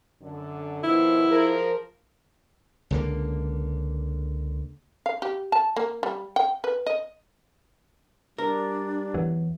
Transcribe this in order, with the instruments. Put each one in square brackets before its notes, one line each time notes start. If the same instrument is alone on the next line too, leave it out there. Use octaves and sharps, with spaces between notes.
[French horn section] F#2 D3
[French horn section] B2 D#3 F3 [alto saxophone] E4
[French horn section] F3 G#4 A#4
[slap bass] C#2 D3 A#3
[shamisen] F5
G4
A5
A#3
G3
G5
B4
D#5
[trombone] G3 [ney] D4 [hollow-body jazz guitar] A#4
[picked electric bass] E2 E3 F#3